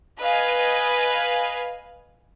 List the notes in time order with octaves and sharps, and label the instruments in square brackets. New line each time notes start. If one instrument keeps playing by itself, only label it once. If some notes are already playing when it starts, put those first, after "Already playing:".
[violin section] B4 D#5 F5 G#5